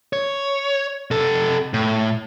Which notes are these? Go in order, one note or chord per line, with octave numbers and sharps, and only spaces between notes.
C#5
C3 A4
A2